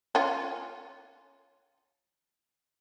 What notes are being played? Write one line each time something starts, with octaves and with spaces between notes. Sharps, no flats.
C#4 F4